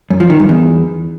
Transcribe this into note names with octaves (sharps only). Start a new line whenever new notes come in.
F#2
F3
D#3
G2
E2